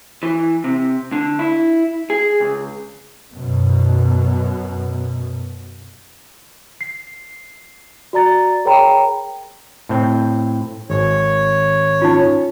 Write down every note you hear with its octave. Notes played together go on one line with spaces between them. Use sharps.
E3
C3
D3
E4
G#4
C#2
F#2 B2
C7
F#4 D5 A#5 A6
G#4 A#4 C#5 G5 A#5 B5
A2 C4
G#1 C#5
C#4 D#4 F4